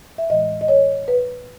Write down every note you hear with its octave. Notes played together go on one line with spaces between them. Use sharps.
E5
A2 E3 G#3 D#5
D#5
C#5
B4